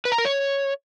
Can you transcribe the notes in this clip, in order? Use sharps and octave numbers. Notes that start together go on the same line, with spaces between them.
B4
A#5
A#4
C#5